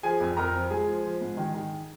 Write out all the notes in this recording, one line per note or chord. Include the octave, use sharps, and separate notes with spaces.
F3 G#4 G#5
F2
F2 A#4 A#5
F3
G#3 G#4 G#5
F3
F3
G#2
D#3
D#3